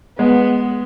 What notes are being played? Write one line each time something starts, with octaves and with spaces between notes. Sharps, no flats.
G#3 B3